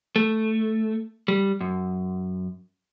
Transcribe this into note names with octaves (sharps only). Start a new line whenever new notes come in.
A3
G3
F#2